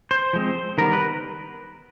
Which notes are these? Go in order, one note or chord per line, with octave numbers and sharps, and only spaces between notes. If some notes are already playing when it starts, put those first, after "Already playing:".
C5
F3 G#3 C4
D#3 G3 B3 A#4
B4